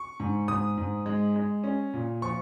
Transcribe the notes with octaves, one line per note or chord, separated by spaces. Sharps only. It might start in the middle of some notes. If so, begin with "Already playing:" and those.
Already playing: C#6
G#2
G#2 D#6
G#2
G#3
G#3
C#4
A#2
F3 C#6